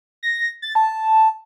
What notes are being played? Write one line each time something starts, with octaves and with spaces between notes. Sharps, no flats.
A#6
A6
A5